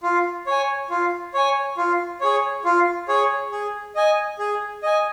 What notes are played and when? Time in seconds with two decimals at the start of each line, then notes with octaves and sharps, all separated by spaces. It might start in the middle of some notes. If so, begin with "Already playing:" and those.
0.03 F4
0.46 C#5 G#5
0.90 F4
1.34 C#5 G#5
1.77 F4
2.21 G#4 C#5
2.65 F4
3.08 G#4 C#5
3.52 G#4
3.95 D#5 G#5
4.39 G#4
4.83 D#5 G#5